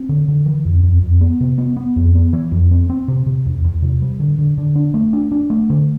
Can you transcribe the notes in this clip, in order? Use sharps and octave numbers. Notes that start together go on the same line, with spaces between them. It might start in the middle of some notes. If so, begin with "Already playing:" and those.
Already playing: C4
D3
D3
E3
F2
F2
F2
B3
C3
B3
B3
F2
B3
E3
F2
C4
C4
C3
C3
E2
E2
C3
G3
D3
D3
D3
D4
A3
D4
D4
A3
D3